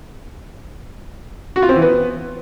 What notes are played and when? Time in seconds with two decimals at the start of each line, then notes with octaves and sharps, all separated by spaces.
1.56 F#4
1.62 F4
1.69 C4
1.75 E3
1.82 B3